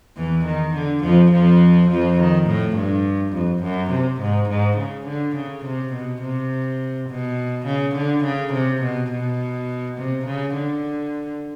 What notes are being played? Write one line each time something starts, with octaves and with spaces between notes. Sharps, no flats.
E2 E3
D#3
D3
F2 F3
F2 F3
F2 F3
D#3
A2
G2
F2
F#2
C3
G#2
G#2
C#3
D3
C#3
C3
B2
C3
B2
C#3
D3
C#3
C3
B2
B2
C3
C#3
D3